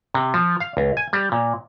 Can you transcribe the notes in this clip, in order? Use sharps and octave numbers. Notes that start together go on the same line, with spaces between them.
C3
F3
F5
C#2
G#5
G3
A#2